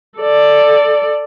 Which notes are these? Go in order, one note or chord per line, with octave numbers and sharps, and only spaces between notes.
A4 D5